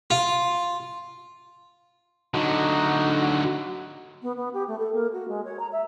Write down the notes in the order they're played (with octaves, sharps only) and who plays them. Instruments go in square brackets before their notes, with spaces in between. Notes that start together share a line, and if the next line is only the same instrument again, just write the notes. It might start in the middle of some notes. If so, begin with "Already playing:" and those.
[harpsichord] F4
[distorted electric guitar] D3 F#3 [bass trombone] D#4 [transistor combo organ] F#4
[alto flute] B3
B3
G4
A3
A4
A#3
F#4
G#3
C#5
A#5
E5